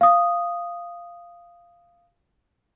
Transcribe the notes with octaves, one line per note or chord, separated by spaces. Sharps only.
F5 D#6